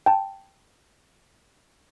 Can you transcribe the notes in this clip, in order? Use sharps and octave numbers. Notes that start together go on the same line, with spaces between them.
G5 A5